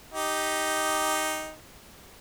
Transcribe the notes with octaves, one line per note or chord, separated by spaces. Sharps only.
D#4 G4